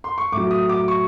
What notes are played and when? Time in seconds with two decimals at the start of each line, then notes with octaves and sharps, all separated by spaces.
0.04 C6
0.18 C#6
0.32 A2 F#3 D6
0.51 D#6
0.69 D6
0.88 C#6